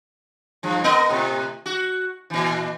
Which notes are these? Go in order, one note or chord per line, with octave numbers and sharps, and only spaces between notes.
G2 F3
B3 A#4 D#5
A2 C3
F#4
A#2 E3